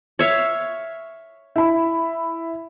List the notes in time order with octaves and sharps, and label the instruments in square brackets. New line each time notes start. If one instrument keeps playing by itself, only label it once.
[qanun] C#5 E5 F5
[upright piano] E4 B5